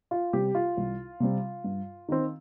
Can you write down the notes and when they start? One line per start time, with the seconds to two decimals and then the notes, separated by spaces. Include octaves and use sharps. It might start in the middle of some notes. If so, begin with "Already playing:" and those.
0.11 F4
0.33 C3 G3 C4 G4
0.55 F4
0.77 C2
1.20 C3 G3 C4
1.64 G2
2.09 D#3 C4